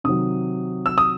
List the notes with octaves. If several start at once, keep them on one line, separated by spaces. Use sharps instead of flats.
C3 D#3 F#3 D#6
E6
D#6